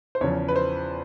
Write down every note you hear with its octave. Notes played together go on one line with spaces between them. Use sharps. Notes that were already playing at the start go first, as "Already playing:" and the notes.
C5
E2 C#3 F3 C#5
B4
C5